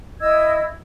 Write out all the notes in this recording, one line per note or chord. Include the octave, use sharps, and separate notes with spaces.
E4 D#5 E6 G#6